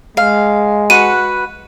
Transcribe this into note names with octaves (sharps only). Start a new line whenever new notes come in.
G#3 F5
F#4 B4 F#5 D#7